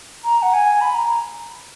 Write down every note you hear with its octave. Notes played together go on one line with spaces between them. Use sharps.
A#5
F#5
G#5
B5
A#5